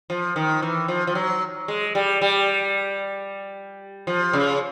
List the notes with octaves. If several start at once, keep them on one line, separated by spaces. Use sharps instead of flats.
F3
D#3
E3
F3
F3
F#3
G#3
G3
G3
F3
C#3